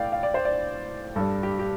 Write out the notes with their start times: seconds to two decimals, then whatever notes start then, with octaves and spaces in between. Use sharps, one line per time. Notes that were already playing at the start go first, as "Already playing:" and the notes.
Already playing: A2 A3 D5 F5 G5
0.12 F5
0.23 D5
0.34 C5
0.45 D5
1.16 G2 G3 A4
1.43 G4
1.59 G4